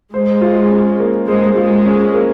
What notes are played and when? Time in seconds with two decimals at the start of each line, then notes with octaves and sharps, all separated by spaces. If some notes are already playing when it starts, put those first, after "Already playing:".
0.13 G#3 C5
0.41 F4
0.71 C#4
1.00 A#3
1.28 G#3 C5
1.56 G#3 F4
1.85 C#4
2.14 A#3